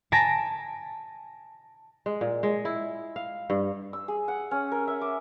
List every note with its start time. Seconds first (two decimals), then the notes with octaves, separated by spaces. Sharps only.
0.12 G#5 A5 A#6 B6 D7
2.06 G#3
2.21 A#2
2.43 G#3
2.65 E4
3.16 F5
3.50 G2
3.93 E6
4.08 G#4
4.28 F#5
4.51 C#4
4.72 A#4
4.87 E5
5.01 D6